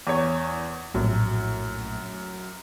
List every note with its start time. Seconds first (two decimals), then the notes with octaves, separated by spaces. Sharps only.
0.07 E2 C#5
0.94 A#1 F#2 A2